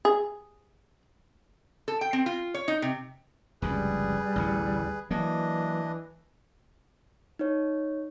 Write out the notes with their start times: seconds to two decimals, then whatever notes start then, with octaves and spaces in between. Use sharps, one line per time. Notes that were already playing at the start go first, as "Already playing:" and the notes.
0.05 G#4
1.88 A4
2.01 G5
2.13 C4
2.26 F4
2.54 C#5
2.68 D#4
2.82 C3
3.62 F1 C#2 F#2 G3 G#4 B4
4.36 A1 D2 D3
5.11 E3 F#3 A#3 D4 D#5
7.39 D#4 C#5